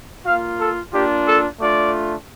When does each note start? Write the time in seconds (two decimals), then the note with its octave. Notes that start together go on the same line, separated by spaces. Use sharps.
0.26 A#3 F4 F5
0.59 A4
0.93 A#3 D4 F4 G4
1.27 A4
1.61 A3 D4 F4 D5